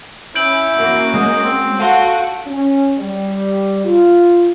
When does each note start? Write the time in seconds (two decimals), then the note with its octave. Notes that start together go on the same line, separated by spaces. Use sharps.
0.35 C#4 E4 G6 D7 F#7
0.78 A#3 C#4 F#4
1.14 G#3 D#5
1.44 C4
1.80 F#4 A4 F5 F#5 C6
2.46 C#4
2.98 G3
3.84 F4